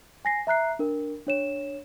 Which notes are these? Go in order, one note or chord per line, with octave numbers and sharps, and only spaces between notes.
G#5 A#6 C7
E5 A#5 F#6 C7
D4 A#4
D4 C#5 E7